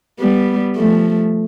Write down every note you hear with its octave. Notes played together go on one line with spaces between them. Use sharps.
G3 B3
F3 A3